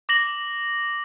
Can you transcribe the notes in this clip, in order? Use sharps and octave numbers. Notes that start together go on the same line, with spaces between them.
D6 A#6 F#7